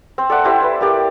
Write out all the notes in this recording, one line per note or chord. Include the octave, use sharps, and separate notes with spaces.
C4
A4 D5 E5 F#5
C4 E4 G4 C5
B4
A#3 G4 D5